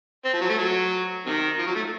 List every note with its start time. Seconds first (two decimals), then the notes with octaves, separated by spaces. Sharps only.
0.25 C4
0.33 F3
0.41 F#3
0.49 A3
0.58 F#3
1.26 C3 D#3
1.59 F3
1.66 F#3
1.75 A3